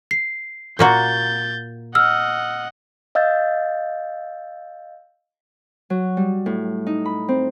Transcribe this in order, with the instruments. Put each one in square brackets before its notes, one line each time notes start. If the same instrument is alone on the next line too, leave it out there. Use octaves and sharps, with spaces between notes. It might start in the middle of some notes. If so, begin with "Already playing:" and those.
[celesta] C7
[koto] A#2 A#3 F#4 [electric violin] G6 A6
[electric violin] D#5 F#5 [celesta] E6 F6
[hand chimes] D#5 F5 E6 G6 A6
[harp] F#3
G3
A2
D#4
B5
C4